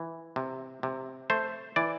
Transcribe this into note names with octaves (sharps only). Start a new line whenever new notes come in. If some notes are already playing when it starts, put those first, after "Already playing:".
Already playing: E3
C3
C3
A3 C5
E3 D5